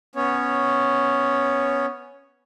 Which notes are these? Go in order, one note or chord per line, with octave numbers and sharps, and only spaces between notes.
B3 C#4 C#5